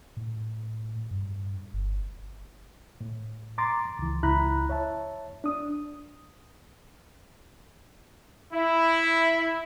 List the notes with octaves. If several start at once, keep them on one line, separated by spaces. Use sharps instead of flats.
A2
G2
G1
A2
A#5 C6 D6 A6
C#2 E3
C#2 E4 A#5 B5 F#6
C#5 E5 A5
D4 D#6
E4